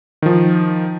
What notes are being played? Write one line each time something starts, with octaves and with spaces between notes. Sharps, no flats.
D#3 F3